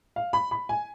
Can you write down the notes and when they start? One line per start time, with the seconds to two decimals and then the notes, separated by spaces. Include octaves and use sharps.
0.16 F5
0.33 B5
0.51 B5
0.69 G#5